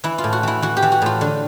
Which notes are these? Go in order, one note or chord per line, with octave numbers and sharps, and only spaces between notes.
E3 E4
F4
A2
F#4
E3 E4
E3 F#4
G4
E3
F#4
A2 F4
D3